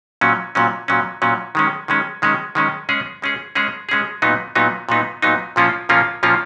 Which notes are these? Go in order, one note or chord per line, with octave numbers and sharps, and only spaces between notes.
A#2 F#3 C#4
A#2 F#3 C#4
A#2 F#3 C#4
A#2 F#3 C#4
D#3 G#3 C#4
D#3 G#3 C#4
D#3 G#3 C#4
D#3 G#3 C#4
G#3 C#4 G#4
G#3 C#4 G#4
G#3 C#4 G#4
G#3 C#4 G#4
A#2 F#3 B3 D#4
A#2 F#3 B3 D#4
A#2 F#3 B3 D#4
A#2 F#3 B3 D#4
A#2 F3 A#3 C#4 F4
A#2 F3 A#3 C#4 F4
A#2 F3 A#3 C#4 F4